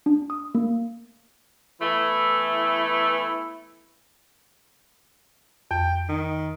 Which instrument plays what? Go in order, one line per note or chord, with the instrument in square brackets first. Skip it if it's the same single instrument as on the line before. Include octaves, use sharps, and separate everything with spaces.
[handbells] D4
D#6
A#3
[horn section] E3 A3 B3 E4
[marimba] F2 [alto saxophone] G5
[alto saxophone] D#3